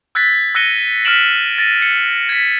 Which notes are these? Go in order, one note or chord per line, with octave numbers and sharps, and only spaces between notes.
E6 F#6 G#6 A6 B6
E6 F#6 A#6 C#7 D#7 G7
F6 A#6 B6 D7 E7 F#7
A6 A#6 D7 D#7
C#7
G#6 B6